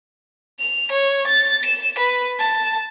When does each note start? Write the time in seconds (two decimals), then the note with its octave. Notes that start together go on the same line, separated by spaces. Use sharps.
0.59 F7
0.91 C#5
1.27 A6
1.65 E7
1.98 B4
2.39 A5